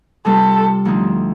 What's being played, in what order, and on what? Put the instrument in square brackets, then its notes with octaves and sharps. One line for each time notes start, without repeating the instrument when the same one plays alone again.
[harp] C3 G3 C4 F4 [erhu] A4
[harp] D2 D3 F3 C4 D#4